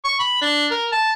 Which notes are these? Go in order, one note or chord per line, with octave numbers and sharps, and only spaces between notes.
C#6
B5
D4
A#4
A5